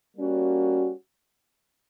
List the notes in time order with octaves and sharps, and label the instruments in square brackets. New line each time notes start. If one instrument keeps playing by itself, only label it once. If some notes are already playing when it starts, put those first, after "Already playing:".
[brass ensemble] G3 A#3 C#4 F#4